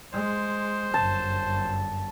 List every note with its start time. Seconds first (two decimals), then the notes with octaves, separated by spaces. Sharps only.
0.13 G#3 C5
0.94 G1 F#2 A5